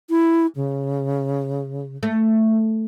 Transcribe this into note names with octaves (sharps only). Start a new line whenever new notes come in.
E4
C#3
A3